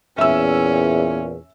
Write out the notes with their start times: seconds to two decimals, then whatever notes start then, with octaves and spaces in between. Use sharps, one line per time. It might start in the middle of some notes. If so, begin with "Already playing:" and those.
0.18 E2 A#2 C#4 E5 E6